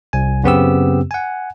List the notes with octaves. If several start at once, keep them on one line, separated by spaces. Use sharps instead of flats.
C2 G#5
F#2 C#3 B3 C4 G4 E6
F#5 G#5